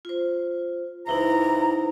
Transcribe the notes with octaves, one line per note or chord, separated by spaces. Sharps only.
F4 C5
C#2 E3 D#4 E4 C5 A#5